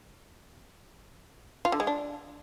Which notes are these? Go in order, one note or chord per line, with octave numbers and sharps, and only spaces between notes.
F4
D3
G#3
D4